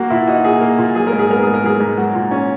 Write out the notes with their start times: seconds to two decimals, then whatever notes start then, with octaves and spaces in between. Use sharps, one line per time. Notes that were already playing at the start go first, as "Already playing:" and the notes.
Already playing: A#3 F#4
0.10 A#2 E4
0.27 D#4 F#4
0.45 A#2 G#4
0.61 A#3
0.79 A#2
0.95 F#3 G#4
1.07 A#4
1.12 G#2
1.19 G#4
1.30 B3 A#4
1.43 G#2 G#4
1.54 A#4
1.64 F#3 G#4
1.80 G#2
1.97 F#3 F#4
2.15 A#2
2.31 C#4